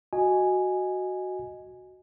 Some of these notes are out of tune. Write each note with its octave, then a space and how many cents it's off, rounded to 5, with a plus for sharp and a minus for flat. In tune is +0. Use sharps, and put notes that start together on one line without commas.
F#4 +0 D#5 +0 G#5 +0